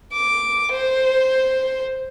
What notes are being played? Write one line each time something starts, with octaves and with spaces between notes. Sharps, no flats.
D6
C5